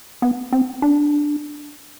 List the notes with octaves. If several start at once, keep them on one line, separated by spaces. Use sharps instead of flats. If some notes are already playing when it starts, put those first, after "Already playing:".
B3
C4
D4